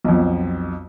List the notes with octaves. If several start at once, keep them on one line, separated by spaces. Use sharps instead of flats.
B1 F2